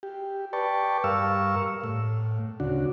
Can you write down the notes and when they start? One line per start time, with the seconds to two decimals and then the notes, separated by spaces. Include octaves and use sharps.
0.03 G4
0.53 B4 D5 G5 A5 C#6
1.04 G2 A#4 F5 C#6 E6
1.84 A2
2.60 D2 C#3 D4 F#4